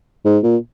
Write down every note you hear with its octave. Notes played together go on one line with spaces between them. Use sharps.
G#2
A#2